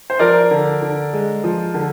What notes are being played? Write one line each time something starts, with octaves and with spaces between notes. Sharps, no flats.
C5
F3 A#4 D5
D3
D3
G#3
F3
D3